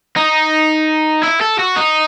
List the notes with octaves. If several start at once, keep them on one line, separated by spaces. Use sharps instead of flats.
D#4
E4
A4
F#4
D#4